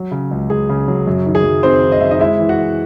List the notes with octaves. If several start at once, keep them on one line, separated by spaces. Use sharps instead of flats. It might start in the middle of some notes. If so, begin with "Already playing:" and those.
Already playing: F#3
C#3
C#2
C#2 G#4
C#3
F#3
F#2
D#3
G#4
F#2
D#3 C4 C5
D#3
D#5
F#2 E5
D#4 D#5
G#3 E4 E5
E3
F#4 F#5
E3